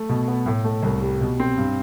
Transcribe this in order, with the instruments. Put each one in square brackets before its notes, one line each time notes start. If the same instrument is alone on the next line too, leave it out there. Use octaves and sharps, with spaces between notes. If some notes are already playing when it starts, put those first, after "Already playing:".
Already playing: [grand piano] A3
B2
B3
A2
A3
C2
G3
B2
C4
G2